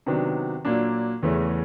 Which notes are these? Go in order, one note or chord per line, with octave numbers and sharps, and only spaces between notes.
C3 D#3 F#3 B3 D4
A#2 F#3 A#3 D4
E2 C#3 E3 A3 C#4